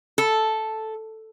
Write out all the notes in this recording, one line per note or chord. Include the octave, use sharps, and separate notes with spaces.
A4